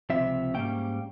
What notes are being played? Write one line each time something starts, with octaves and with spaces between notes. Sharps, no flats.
C#2 C3 F3 C4 E5
G#2 G3 A#3 C#4 G5